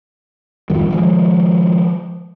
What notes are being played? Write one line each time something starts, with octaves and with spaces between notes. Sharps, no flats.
D1 F2 D#3 G3
D#3 F3 G#3